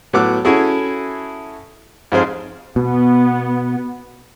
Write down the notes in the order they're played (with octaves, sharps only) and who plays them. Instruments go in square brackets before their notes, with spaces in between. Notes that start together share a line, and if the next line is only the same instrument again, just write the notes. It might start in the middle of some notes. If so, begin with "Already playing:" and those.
[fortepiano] A2 F#3 B3 F#5 D6 E6
C#4 E4 F#4 G#4 A4
F2 G#2 G#4 C5 F5
[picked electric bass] B2 [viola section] B3